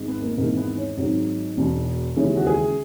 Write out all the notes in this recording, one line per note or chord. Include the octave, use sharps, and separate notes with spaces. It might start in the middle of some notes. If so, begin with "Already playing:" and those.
Already playing: G#1 G#2
B3
A#3
G#1 G#2 E3 A#3
B3
C#4
G#1 G#2 F#3 D#4
E1 E2 B2
D#2 C#3 E3 G#3 C#4
F#4
G#4